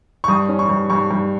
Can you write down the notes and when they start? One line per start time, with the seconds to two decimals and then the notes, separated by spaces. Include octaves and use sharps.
0.24 C#6
0.28 G2 D#6
0.49 C#4
0.59 C#6
0.69 G2
0.90 G2 C#6
1.11 G2